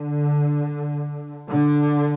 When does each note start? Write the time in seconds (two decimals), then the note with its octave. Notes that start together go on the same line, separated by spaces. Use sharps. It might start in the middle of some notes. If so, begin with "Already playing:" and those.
Already playing: D3
1.49 D3